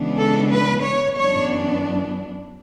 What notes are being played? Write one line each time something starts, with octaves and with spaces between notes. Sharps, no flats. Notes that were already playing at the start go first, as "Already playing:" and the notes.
Already playing: C#3 E3 G#3 B3 D4
A4
B4
C#5
F#2 E3 B3 D4 C#5